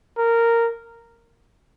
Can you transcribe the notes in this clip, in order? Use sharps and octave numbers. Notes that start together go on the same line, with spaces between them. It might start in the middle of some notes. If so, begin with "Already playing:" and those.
A#4